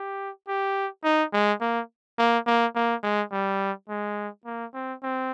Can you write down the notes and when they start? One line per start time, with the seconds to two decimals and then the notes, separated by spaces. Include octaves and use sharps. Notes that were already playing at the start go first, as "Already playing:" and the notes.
Already playing: G4
0.48 G4
1.04 D#4
1.33 G#3
1.61 A#3
2.19 A#3
2.47 A#3
2.75 A#3
3.03 G#3
3.32 G3
3.89 G#3
4.45 A#3
4.74 C4
5.03 C4